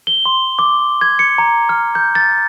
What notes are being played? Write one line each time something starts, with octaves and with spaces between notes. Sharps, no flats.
G7
C6
D6
G#6
C#7
A#5
F6
G6
A6